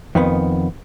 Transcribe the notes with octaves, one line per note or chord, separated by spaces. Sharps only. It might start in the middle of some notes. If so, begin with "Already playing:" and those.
F2 D#3 B3